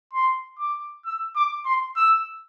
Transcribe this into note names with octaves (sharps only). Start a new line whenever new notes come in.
C6
D6
E6
D6
C6
E6